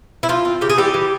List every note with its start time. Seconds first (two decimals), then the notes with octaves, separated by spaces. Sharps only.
0.23 E4
0.29 F3 F4
0.45 C4
0.61 C#3 G4
0.70 G#4
0.77 E3 G3 G4
0.94 E3